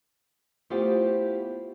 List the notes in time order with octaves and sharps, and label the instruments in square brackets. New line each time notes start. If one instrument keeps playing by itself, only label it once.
[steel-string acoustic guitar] A3 B3 E4 F4 G4 C5